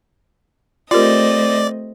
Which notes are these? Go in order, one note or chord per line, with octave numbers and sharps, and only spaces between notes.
A3 C4 F4 G4 A#4 D5 D#5